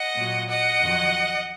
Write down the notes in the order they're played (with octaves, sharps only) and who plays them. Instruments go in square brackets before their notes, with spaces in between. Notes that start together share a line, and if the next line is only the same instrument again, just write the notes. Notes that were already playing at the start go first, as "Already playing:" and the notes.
Already playing: [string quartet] D#5 F#5
A#2 F#3
D#5 F#5
F2 D#3 F#3